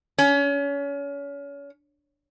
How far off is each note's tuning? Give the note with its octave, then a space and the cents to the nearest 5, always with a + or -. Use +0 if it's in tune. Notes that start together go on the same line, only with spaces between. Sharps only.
C#4 +30